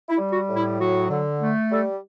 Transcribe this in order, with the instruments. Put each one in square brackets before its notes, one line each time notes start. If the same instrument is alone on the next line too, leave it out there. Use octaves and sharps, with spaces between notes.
[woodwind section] E4
G3
F#4
A2
E4
F#3 F#4
D3
A3
G3 A4